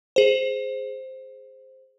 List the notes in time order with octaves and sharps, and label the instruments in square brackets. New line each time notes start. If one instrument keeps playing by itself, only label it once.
[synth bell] G#4 C5